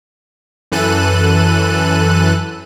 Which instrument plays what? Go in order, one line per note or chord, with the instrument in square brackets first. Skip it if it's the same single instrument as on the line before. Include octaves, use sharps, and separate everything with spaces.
[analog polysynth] F#2 E3 A4 F#6 D#7